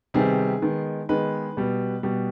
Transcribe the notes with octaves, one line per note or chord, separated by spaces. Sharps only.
C3 D#3 G3 B3 G#4
D#3 G#3 B3
D#3 G#3 B3 B4
B2 G3 B3
B2 G3 B3